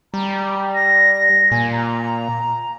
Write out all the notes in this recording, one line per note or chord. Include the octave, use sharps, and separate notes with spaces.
G3 A#5
A#6
A#2 G#5
A#5